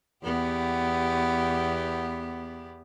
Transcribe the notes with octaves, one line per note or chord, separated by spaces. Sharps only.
E2 B3 G4